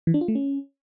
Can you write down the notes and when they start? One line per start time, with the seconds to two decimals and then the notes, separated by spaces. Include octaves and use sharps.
0.07 E3
0.14 D4
0.21 F4
0.28 A3
0.35 C#4